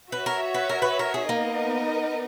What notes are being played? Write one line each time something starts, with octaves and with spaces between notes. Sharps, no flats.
F#4 B4 C#5 E5
A#4
B4
A#4
B4
A#4
G#4
A#3 B3 D#4 A#4 D#5